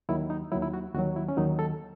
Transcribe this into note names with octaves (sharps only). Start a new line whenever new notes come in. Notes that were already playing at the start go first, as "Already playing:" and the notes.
D#2 D#3 F#3 E4
D#4
D#2 D#3 F#3 E4
E4
F#4
D#2 D#3 F#3 F#4
E4
C#4
D#2 D#3 F#3 D#4
A4